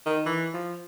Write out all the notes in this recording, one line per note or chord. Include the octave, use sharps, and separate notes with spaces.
D#3
E3
F3